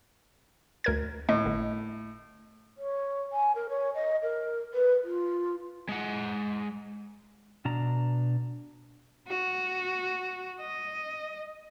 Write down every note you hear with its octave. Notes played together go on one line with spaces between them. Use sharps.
D2 A#4 G#6
A2 D#5
G1 D3
C#5
G#5
A#4
C#5
D#5
A#4
B4
F4
G#3 F#5
B2 D4 A#5
F#4
D#5